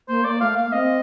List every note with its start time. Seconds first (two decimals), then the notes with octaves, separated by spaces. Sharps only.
0.09 A#3 C5
0.24 A#3 D5
0.40 A3 F5
0.56 A#3 F5
0.72 C4 D#5